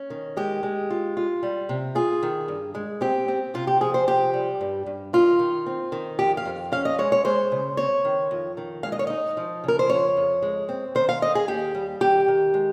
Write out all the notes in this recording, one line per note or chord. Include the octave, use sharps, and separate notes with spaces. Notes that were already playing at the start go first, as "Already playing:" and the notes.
Already playing: C#4
D#3
G#3 G4
G#3
F4
F4
G3
C3
F4 G#4
D#3
G2
G#3
C4 G4
C4
C3 F4
G4
F3 G#4
C5
C3 G4
G3
G2
G2
D#3 F4
D#3
C4
D#3
F2 G4
F5
F2
C#4 F5
D#5
G#3 C#5
C#5
G#3 C5
C#3
C4 C#5
D#3
F2
D#3
G#3 F5
D#5
C#5
D#4 D#5
F3
C#3 A#4
C5
F2 C#5
F2
G#3
C4
D#3 C5
F5
D#3 D#5
G#4
D#2 G4
G3
D#3 G4
D#3
G#3